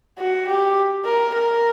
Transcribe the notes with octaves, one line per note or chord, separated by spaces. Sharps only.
F#4
G4
A#4
A#4